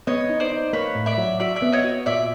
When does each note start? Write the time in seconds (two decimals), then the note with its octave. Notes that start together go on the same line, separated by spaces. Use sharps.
0.07 B3 C#5 D#5
0.29 D#4
0.40 C5 D5
0.52 D#4
0.73 A#3 B4 C#5
0.95 A2
1.06 D5 E5
1.18 F#3
1.40 F#4 D5 E5
1.56 D5 E5
1.62 B3
1.72 C#5 D#5
1.84 F#4
2.06 A#2 D5 E5